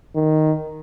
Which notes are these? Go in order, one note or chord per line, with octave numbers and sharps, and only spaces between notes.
D#3